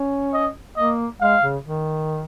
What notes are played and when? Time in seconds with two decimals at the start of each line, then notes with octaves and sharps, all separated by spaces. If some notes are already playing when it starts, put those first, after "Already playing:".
Already playing: C#4
0.34 D#5
0.77 A#3 D#5
1.21 G#3 F5
1.42 C#3
1.64 D#3